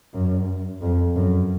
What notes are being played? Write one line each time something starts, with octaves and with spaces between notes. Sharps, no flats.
F#2
F2
F#2